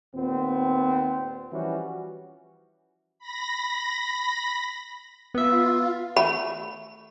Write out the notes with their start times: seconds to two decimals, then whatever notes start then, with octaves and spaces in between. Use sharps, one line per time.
0.15 D#2 A#2 B3 C4
1.52 E3 F3 G3 C#4 F#4
3.19 B5 A#6
5.34 B3 F4 E5
6.16 A3 B5